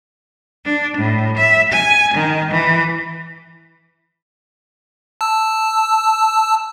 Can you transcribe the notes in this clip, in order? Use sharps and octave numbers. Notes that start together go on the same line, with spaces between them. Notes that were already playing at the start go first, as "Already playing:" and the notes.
D4
A2
E5
G#5
D#3
E3
A5 E6